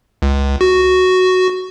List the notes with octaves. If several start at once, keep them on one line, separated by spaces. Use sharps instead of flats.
C#2
F#4